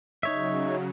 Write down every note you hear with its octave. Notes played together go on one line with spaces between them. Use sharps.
C#3 F#3 D#4 C#5 E5